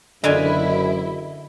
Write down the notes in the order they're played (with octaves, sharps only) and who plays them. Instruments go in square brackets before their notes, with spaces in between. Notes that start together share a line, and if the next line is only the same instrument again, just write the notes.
[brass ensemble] F#1 F#2 [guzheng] D3 F4 G#5 [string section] E3 E4 [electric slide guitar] D#5